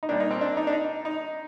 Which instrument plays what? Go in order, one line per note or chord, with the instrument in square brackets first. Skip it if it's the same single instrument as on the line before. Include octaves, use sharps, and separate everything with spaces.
[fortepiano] D#4
A#2 G3 A#3 D4
D#4
C4
D4
D#4
D4
D#4
D#4